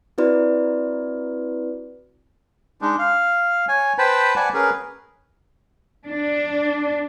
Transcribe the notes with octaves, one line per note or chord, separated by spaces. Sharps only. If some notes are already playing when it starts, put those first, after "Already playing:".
C4 E4 F#4 B4 D5
G#3 D4 D#4
F5
C#5 G#5
B4 C5 G5 A5 B5
D5 F#5 G#5 A5
C#4 G#4 A#4 B4
D4